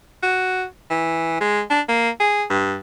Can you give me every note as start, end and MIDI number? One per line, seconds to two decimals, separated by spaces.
0.23 0.65 66
0.90 1.38 52
1.40 1.62 56
1.70 1.81 62
1.88 2.10 58
2.20 2.44 68
2.50 2.76 43